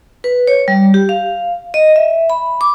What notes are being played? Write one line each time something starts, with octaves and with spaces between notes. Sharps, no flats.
B4
C#5
G3
G4
F5
D#5
E5
B5
D6